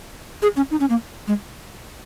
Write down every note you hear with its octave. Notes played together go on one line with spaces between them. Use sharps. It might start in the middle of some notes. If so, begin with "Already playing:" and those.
G#4
C#4
D#4
C#4
A#3
G#3